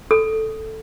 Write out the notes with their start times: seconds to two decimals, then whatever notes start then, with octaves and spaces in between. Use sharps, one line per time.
0.11 A4